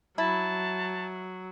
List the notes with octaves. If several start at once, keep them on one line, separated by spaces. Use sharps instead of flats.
F#3 E4 A5